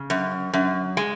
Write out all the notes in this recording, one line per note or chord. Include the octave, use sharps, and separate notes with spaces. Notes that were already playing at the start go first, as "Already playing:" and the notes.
Already playing: C#3
F#2
F#2
G#3